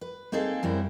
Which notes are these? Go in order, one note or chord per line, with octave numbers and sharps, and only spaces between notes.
B4
A#3 C4 D#4 G#4 A4 F5
F#2 G3 C4 E4